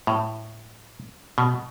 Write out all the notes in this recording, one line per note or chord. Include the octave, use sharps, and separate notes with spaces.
A2
B2